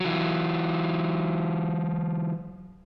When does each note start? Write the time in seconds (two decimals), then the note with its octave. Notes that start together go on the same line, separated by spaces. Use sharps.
0.01 E3 F#3